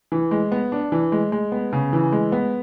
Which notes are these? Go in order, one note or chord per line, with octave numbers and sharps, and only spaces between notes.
E3
G#3
B3
D4
E3
G#3
G#3
B3
C#3
E3
G#3
B3